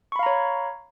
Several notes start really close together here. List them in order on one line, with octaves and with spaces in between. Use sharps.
C#6 B5 F5 A#5 C#5